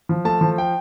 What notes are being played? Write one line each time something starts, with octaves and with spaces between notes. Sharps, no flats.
F3
A3 A5
F3
G5